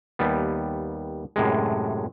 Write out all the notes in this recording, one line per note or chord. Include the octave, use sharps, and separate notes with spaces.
D#2 G3 B3
F#2 A2 C3 G#3